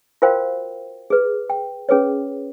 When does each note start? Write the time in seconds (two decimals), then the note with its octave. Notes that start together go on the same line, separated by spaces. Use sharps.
0.22 F4 F#4 A#4 C5 F5 G5
1.10 G#4 B4
1.50 G5
1.89 C#4 G#4 B4 C#5